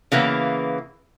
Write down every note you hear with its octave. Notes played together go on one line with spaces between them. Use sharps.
C#3 E3 A#3 B3